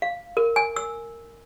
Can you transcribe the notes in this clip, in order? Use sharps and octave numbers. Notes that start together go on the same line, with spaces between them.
F5
A#4
G#5
E6